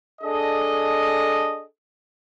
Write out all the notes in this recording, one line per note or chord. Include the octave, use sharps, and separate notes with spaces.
D4 G#4 A4 D#5